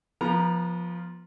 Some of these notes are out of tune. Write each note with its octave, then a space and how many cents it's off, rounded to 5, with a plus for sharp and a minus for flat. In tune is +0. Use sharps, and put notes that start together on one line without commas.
F3 +0 B3 -35 A#5 +0